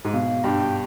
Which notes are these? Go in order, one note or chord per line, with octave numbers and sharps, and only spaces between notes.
G#2
B2 F5
G2 G5